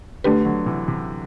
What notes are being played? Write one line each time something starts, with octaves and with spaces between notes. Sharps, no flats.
D3 A3 D4 G4 B4
D3 F#3
C3 E3
C3